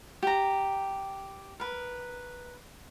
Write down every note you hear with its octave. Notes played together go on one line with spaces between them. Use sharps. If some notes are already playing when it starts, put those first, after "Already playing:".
G4 A#5
A#4 B4